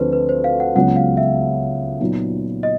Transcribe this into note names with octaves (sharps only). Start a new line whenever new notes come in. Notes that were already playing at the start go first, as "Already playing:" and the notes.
Already playing: D2 D3 F3 A3 C4 B4 C5
B4
C5
F5
F#5
C#2 C#3 F#3 B3 F#5
F5
E5
A#2 F#3 B3 D#4
D#5